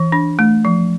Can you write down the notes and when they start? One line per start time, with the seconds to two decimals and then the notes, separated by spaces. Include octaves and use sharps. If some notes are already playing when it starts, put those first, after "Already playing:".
Already playing: E3
0.12 D4
0.39 A3
0.65 F3